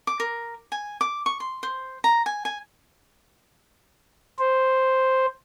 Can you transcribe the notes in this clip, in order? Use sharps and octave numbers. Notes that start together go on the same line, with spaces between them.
D6
A#4
G#5
D6
C#6
C6
C5
A#5
G#5
G#5
C5